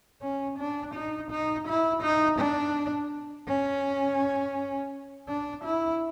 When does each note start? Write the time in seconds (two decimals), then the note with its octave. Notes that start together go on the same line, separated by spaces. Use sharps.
0.22 C#4
0.58 D4
0.94 D#4
1.31 D#4
1.67 E4
2.02 D#4
2.39 D4
3.48 C#4
5.28 D4
5.64 E4